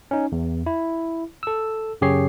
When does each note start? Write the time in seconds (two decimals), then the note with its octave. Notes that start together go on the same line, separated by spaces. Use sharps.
0.11 C#4 D#4
0.32 E2
0.66 E4
1.43 A4 E6
2.01 F#2 C#3 G4 G#4 C#5 C7